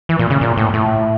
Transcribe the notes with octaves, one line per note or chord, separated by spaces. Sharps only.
E3
A#2
C#3
A#2
A2
A2